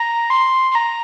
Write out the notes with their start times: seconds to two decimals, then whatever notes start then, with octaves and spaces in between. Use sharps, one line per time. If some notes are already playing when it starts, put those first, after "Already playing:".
Already playing: A#5
0.30 C6
0.71 C6
0.75 A#5